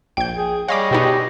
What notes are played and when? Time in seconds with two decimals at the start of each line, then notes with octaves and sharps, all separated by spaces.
0.17 A#1 G5 G6
0.38 G#4
0.68 G3 G#4 C#5 D#5 F5 B5 D6
0.91 B2 B3 D#4 G4